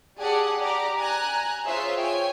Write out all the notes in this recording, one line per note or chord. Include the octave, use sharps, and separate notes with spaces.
G4 G#4 D5 F#5 G#5 A5
G4 D5 A#5 D6
G#5 A#5 F#6
F4 G#4 C5 C#5 E5 C6
C#5 G5 G#5